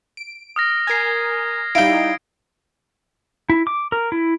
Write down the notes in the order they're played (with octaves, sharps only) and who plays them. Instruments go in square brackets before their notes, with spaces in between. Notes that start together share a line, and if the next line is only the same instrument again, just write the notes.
[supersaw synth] D7
[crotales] D#6 F6 A#6
[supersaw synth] A#4 G#5 [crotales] G#6 C7
[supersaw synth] G3 D#4 E4 [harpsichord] F5 G5 [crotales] D7
[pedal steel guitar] E4
D6
A#4
E4